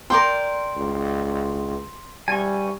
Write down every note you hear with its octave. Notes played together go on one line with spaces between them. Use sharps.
A#4 D5 G5 C6
C#2
G3 G#5 C#6